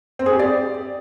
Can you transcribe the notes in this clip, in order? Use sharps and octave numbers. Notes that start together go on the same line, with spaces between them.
C4
G#4
G4
D5